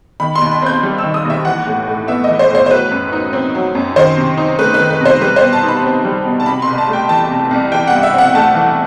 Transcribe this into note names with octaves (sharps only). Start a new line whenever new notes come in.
D#3 B5
C6
D#2
B5
C4 G6
G3
D#3 E6
D#6
D#2 E5
E3 F#5
A2
A2
B3 E5
E3 D#5
C5
A2 C5
C5
F#3 B4
F#2
D#4
C4
F#3
F#2
D#3 C5
C3
D#4
A3 B4
B4
D#3
B4
C3 C5
G3 B4
C5
B2
A5
D#4
B5
C4
G3
B2
A5
C3 B5
C2 C6
A5
A3
G5
E3 A5
C3
C2
E3 G5
F#5
G2
E5
C4 F#5
A3 A5
E3